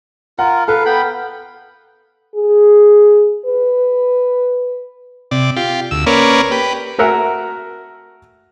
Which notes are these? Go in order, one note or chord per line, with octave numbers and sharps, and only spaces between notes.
F4 A#4 F#5
A4 B4 F5
B3 G5 B5
G#4
B4
C3 D5
F4 G4
D2 E6
A#3 C#4 A#4 B4 C#5 D5
G4 B4
A3 F#4 A#4 E5 F#5 G#5